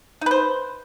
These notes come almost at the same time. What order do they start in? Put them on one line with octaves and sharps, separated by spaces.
D#4 B4 C5